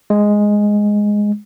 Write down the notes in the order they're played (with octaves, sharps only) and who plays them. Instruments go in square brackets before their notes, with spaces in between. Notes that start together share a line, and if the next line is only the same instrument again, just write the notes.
[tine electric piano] G#3